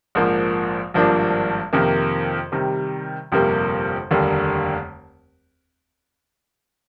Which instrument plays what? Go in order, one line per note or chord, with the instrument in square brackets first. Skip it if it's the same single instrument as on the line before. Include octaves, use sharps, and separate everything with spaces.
[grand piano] A#1 G#2 F3 A#3
G#1 G2 F3 A#3 D4
F2 C3 D#3 A#3
C3 D#3 G3
G1 F2 C3 G3 A#3
F1 D#2 D3 G3 A#3